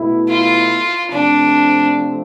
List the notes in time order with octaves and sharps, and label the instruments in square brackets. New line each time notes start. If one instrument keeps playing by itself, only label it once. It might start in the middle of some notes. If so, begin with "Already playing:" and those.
Already playing: [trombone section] B2 A3 E4
[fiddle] F4
[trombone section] C3 F3 A3 C4 [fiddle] D4